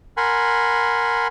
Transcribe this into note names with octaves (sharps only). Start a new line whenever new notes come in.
A#4 F#5 G#5 B5 C6